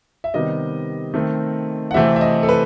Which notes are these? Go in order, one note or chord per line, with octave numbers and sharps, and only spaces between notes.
E5
C3 D#3 G3 B3 D#5
D#3 A3 C4
F#5
C3 E3 A3 C4 E5
E5
D#5
A4
B4